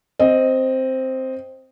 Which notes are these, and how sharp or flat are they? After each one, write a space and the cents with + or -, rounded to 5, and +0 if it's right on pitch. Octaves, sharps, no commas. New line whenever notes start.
C4 +0 D#5 +0